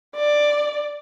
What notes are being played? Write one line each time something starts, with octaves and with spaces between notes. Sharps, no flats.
D5